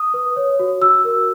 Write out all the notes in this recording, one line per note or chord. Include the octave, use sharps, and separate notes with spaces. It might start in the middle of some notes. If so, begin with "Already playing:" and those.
Already playing: D#6
B4
C#5
F#4
F#4 E6
A#4